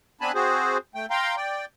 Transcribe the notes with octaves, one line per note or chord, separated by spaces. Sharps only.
B3 C4 D4 G#5 A5 B5
C4 F#4 G#4 C5
A3 G5
F5 G5 A#5 C6
D5 G5